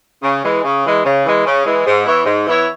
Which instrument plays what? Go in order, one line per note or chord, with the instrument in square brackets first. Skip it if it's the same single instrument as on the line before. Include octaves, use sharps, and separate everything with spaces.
[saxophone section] C#3
E3 G#3
C#3
E3 G#3
C#3
E3 G#3
C#3
E3 G#3
G#2
E3 B3 E4 C#5
G#2
E3 B3 E4 C#5